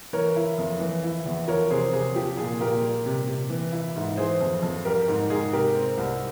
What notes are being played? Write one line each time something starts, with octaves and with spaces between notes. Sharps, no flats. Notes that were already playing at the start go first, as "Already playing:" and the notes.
E3 A#4 C#5
E4
F2
E3
E4
E2
F3 A#4 C#5
C3 G#4 C5
C3 G#4
F3 G4
A#2 G#4
A#2 G4 A#4
G3
C3
C3
E3
E4
G#2
E3 G#4 C5
F2
F2
G3 G4 A#4
G#2
G#2 G#4
C3 G4 A#4
C4
C2